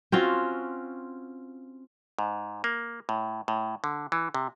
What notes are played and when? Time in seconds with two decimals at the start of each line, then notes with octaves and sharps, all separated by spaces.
0.12 C4 C#4 F4 F#4
2.19 G#2
2.64 A#3
3.09 A2
3.48 A2
3.84 D3
4.12 E3
4.34 C3